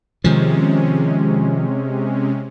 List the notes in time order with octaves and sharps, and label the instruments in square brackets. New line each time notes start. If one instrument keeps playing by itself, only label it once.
[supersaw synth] C3 G#3 C#4 [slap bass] D#3 F3